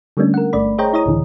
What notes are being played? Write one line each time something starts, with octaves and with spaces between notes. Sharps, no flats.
D3 G3 A3 A#3 C#4 D4
A#4 F#5
G1 A3 D5 B5
G#4 C5 C#5 D#5 G5 A#5
E4 C#5 D#5 A#5 D#6
C#2 A2 D3 E3